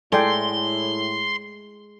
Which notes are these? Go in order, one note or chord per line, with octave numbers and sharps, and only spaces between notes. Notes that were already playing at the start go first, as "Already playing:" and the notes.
A2 G#3 E4 A4 D5 G5 C6